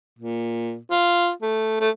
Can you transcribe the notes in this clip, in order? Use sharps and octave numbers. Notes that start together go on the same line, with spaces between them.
A#2
F4
A3
A3